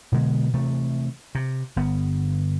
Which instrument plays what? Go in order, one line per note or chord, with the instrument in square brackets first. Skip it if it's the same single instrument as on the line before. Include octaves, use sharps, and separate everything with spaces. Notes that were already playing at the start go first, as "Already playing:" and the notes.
[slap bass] B2 D3 G#3 B3
C3 E3 A3
C3
G1 B3